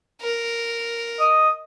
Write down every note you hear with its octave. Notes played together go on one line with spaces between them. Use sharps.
A#4
D#5